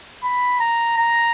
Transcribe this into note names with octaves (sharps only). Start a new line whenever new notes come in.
B5
A#5
A#5